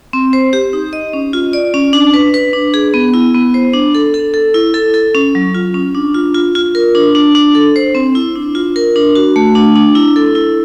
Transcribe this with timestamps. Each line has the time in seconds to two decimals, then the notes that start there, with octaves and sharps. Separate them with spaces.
0.13 C4
0.33 C5
0.53 G4
0.73 D#4
0.93 D#5
1.13 C#4
1.33 F4
1.53 D5
1.74 C#4
1.93 D4
2.14 B4
2.34 B4
2.53 D4
2.74 G#4
2.94 B3
3.14 E4
3.34 B3
3.54 C5
3.73 D4
3.95 A4
4.14 A4
4.34 A4
4.54 E4
4.74 A4
4.94 A4
5.14 C#4
5.35 F#3
5.54 F4
5.74 C#4
5.95 D4
6.14 F4
6.34 F4
6.55 F4
6.75 A#4
6.95 D4
7.15 D4
7.35 D4
7.55 A4
7.76 C5
7.95 C4
8.15 E4
8.35 D4
8.55 F4
8.76 A#4
8.96 D4
9.15 F#4
9.36 A3
9.55 D4
9.76 D4
9.95 E4
10.16 A4
10.35 E4